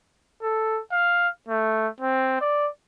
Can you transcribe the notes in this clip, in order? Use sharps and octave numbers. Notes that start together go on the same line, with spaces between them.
A4
F5
A3
C4
D5